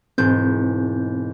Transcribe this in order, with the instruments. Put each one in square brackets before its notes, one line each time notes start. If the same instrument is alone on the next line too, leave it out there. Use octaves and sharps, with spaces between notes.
[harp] E1 G#2 G6 [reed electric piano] C4